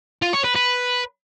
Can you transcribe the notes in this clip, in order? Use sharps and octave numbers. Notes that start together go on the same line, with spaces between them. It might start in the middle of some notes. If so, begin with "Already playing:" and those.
F4
C#5
B4
B4